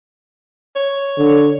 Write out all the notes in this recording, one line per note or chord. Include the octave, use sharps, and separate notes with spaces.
C#5
D3